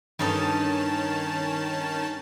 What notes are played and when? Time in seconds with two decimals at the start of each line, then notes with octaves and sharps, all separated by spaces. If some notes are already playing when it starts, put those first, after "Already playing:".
0.19 G2 D#3 C#4 D#4 A4 A5